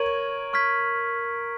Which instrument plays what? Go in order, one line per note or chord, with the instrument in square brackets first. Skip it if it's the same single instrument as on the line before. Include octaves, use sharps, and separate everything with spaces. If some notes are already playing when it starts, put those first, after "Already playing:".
Already playing: [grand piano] A#4 C#5 [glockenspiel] C#6 G#6 D#7 F#7
[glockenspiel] C#6 F6 G#6 B6